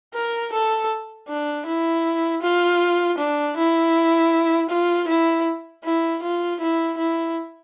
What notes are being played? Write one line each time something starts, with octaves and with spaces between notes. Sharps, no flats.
A#4
A4
D4
E4
F4
D4
E4
F4
E4
E4
F4
E4
E4